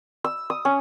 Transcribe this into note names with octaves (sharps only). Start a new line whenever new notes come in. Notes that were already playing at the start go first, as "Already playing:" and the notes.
E6
D#6
C#4